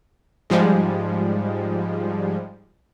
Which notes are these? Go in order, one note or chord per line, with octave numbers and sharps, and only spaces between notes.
G#2 F3 G3 G#3